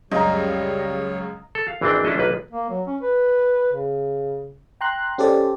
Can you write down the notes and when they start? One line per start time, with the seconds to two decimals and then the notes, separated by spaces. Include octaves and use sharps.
0.11 C#2 F#2 C#3 G3 C#5 D#5 A#5
1.55 A4
1.68 F5
1.81 G#1 E3 A#3 C4 D4 G5
2.05 C#4 D4 E4 A4 D#5
2.18 B1 A#3 B4
2.51 A#3
2.70 F#3
2.87 C#4
3.01 B4
3.73 C#3
4.81 G5 A#5 C6 F#6
5.18 C#4 G4 A4 C5 D5